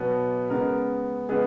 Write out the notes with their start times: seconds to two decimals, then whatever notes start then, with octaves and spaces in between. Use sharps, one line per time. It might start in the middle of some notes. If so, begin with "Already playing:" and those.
Already playing: B2 F#3 B3
0.50 C#3 G#3 B3 A#4
1.29 C#3 G#3 B3 G#4